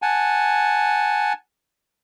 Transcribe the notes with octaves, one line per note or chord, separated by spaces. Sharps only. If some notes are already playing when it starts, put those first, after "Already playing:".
F#5 G#5 A5